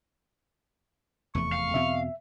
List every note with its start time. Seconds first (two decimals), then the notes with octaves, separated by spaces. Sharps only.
1.35 F1 E2 A3 C#6
1.52 F5
1.74 E2 B2 C4 E5